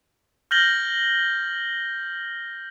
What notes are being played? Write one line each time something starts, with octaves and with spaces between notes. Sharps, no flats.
F6 G6 A6 A#6 F#7 G7